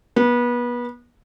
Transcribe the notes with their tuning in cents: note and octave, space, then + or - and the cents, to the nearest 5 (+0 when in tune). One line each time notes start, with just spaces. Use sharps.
B3 -30